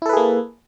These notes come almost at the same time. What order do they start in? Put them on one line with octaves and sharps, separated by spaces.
E4 A4 B4 G#4 A#3